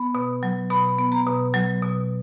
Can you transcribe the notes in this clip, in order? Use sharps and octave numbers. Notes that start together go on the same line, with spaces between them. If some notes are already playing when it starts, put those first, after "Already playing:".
Already playing: B3 B5
B2
F#3
B2 B5
B3
A#5
B2
F#3
B2